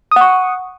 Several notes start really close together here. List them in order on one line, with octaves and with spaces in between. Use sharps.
D#6 F#5 C#6